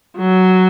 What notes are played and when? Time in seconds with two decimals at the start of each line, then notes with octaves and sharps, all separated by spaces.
0.18 F#3